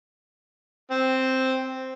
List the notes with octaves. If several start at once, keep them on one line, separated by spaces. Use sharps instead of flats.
C4